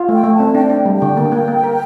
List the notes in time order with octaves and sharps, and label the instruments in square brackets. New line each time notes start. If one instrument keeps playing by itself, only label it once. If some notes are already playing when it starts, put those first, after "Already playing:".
Already playing: [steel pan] F4
[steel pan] A3 [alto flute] G5
[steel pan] A3
[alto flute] A5
[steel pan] C4
[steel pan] D4 [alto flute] G5
[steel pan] D4
G3
[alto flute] G5
[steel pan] D3
A#3
A#3
A#3
A#4